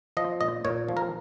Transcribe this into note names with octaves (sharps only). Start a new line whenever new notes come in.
F3 D#5
A#2 D#5
A#2 C#5
F3
A#4